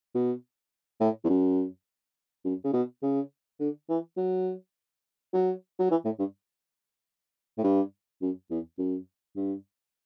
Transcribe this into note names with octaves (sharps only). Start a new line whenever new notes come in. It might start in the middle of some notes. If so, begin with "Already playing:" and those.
B2
A2
E2
F#2
F#2
C#3
B2
C#3
D3
E3
F#3
F#3
F#3
E3
A2
G2
A2
G2
F#2
E2
F#2
G2